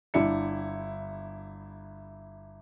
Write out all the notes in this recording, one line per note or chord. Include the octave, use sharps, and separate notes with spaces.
G1 D4 E4 C#7